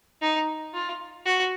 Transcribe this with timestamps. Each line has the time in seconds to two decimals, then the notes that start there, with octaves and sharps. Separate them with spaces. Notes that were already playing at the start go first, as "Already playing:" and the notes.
0.22 D#4
0.74 F4
1.26 F#4